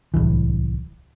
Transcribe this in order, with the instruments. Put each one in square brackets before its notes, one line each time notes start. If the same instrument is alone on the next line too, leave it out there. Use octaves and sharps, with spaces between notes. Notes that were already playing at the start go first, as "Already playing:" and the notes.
[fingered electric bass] D1 G1 C2 E3